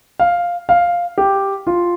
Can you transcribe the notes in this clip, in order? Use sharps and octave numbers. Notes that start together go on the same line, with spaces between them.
F5
F5
G4
F4